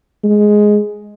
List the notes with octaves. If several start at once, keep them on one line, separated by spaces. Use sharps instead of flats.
G#3